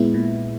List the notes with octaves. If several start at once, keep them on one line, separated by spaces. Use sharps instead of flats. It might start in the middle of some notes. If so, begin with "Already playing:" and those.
Already playing: A#2 G#3 B3 E4
A#2